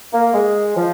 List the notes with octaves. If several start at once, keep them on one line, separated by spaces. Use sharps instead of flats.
A#3
G#3
F3